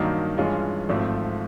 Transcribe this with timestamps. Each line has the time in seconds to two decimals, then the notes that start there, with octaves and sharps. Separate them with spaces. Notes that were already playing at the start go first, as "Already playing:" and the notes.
Already playing: G2 D#3 F#3 A#3 D#4
0.37 G2 E3 G#3 C#4 F4
0.89 G#1 G#2 F3 A3 C4